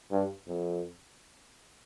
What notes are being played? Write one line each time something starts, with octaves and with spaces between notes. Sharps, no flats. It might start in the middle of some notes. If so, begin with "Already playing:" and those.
G2
F2